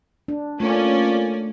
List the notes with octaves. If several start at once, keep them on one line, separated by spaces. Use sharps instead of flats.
D4
A3 A#3 C4 C#4 F4 D5